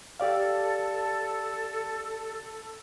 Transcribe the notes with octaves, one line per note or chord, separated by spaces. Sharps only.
G4 A4 D5 F5